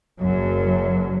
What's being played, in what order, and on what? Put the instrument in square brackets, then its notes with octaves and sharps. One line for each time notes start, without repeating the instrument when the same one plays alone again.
[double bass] F#1 F#3 [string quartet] F#2